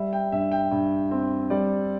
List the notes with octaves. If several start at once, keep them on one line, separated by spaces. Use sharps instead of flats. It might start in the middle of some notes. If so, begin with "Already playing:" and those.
Already playing: G3 E5
G5
G2 E5
G5
G2
C4
G3 D5